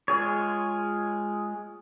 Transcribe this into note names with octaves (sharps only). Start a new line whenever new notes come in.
G#3 F4 G#4 C#5